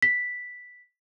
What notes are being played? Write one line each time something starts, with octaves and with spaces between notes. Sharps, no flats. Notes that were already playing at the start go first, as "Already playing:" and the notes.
B6